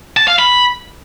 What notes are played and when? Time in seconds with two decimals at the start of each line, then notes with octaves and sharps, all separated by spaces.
0.17 A5
0.28 F5
0.39 B5